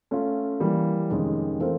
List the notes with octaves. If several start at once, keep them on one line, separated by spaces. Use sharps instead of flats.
A3 C#4 F4
E3 G3 A#3
F2 C3 D#3 G#3 C#4
E3 A3 C4 F4 A#4